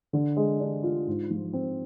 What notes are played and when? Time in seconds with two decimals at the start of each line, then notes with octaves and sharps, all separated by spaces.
0.13 D3
0.37 G#3
0.60 D4
0.83 F4
1.08 G#2
1.31 F3
1.53 C4